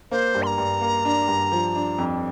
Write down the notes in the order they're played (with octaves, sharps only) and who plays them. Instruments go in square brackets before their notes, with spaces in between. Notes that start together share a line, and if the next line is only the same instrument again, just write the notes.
[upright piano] A#3 [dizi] C5
[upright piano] G2
[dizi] C6
A#5
[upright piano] G2
A#3
D4
G2
F3
D4
F2